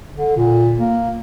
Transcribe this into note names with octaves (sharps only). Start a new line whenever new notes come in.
D3
A#2
A#3